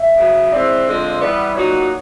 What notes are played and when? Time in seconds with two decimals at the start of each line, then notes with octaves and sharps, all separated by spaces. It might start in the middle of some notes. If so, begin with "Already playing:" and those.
Already playing: E5
0.16 C#3 F#3 B3
0.52 E3 G#3 C4 D5
0.86 D3 F3 G#3 C4 F4
1.20 E3 G3 B3 D5
1.55 A#2 F#3 B3 D#4 F#4 C#5